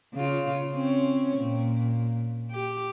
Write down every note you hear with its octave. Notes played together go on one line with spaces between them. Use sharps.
C#3 F4
C4 C#4
A#2
G4